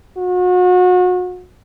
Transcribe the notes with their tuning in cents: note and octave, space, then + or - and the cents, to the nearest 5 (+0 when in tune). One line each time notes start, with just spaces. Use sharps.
F#4 -35